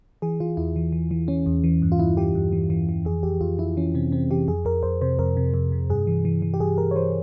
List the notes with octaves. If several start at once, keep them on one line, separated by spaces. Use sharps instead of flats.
E3 G#4
E3 F4
E2 E4
E3
E3
E3
E3 C#4
E2
E3
G2
F4
G2 E4
E3 G4
G2
E3
E3
E3
F2 G#4
F2 G4
F2 F4
F2 E4
E3 C#4
C3 C4
C3 C4
E3 G4
F2 G#4
F2 A#4
F2 C5
C3 C5
F2 A#4
C3
F2
C3
G2 G#4
E3
E3
E3
G4
G2 G#4
G2 A#4
C#5
E3 C5